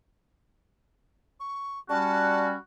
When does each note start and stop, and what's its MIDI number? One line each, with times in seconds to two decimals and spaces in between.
1.40 1.79 85
1.90 2.54 55
1.90 2.54 61
1.90 2.54 66
1.90 2.47 81